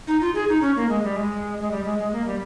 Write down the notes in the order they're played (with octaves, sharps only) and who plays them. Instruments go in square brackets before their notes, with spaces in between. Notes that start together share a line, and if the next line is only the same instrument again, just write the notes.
[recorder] D#4
F4
G#4
D#4
C#4
A#3
G#3
G3
G#3
G#3
G3
G#3
G#3
A#3
G3